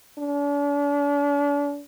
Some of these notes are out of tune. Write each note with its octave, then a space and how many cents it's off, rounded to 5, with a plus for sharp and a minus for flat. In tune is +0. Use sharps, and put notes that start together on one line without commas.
D4 -40